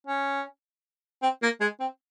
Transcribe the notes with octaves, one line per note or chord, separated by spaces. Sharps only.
C#4
C4
A#3
G#3
C4